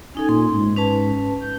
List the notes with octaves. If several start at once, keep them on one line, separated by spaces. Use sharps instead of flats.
C#4 D#4 A4 G#5
A#2 C6
G#2
C#4 B4 A5
G6